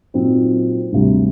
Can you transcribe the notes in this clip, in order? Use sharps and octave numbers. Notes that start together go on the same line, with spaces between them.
A#2 F#3 C4 D#4
D2 C3 G3